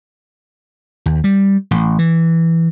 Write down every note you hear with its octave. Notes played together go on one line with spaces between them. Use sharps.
D#2
G3
A1
E3